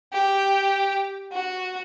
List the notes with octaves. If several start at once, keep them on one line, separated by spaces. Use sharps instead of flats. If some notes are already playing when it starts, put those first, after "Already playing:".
G4
F#4